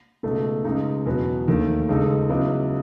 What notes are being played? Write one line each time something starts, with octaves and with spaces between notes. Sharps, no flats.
C#2 B2 A3 D#4 A4
C#2 C#3 G#3 D#4
E2 B2 F#3 B3
D#2 D#3 A3
C#2 C#3 G#3 D#4 A4
C#2 C#3 F#3 B3 E4